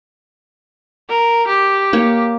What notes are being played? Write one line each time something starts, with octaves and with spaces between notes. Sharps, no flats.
A#4
G4
A#3 C#5